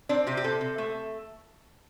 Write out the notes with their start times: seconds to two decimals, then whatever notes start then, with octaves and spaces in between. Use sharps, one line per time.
0.09 C4 D4
0.27 C3 G4
0.37 G4
0.44 C3 A4
0.61 C3
0.78 A3